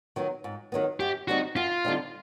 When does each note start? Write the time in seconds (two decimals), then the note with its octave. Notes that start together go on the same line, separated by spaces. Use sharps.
0.16 D#3 F#3 B3
0.44 G#2
0.72 D#3 F#3 B3
1.00 F#2 G4
1.28 D3 G3 C4 D#4 F#4
1.56 F#2 F4
1.85 D3 G3 C4 D#4